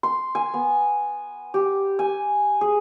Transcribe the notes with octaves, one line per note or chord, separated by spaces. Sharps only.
C6
G#5
B3
G4
G#5
G#4